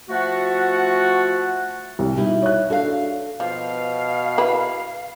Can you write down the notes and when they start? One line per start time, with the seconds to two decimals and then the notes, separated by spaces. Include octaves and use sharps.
0.09 F3 A3 F#4 F#5
1.99 C2
2.16 B2 G3 D#4 E4
2.42 C#5 F#6
2.70 D4 F#4 A4 F5
3.40 B2 F3 F5
4.38 E4 B4